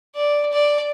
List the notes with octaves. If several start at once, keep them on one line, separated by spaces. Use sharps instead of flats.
D5
D5